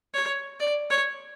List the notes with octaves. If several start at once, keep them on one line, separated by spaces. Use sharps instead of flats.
C#5
D5
C#5